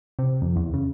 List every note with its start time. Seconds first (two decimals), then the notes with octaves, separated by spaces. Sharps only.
0.19 C3
0.42 F2
0.56 E2
0.74 C#3